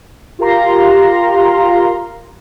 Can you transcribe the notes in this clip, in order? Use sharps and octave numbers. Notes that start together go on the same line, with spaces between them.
F4 G4 A#4 F5 A#5 C6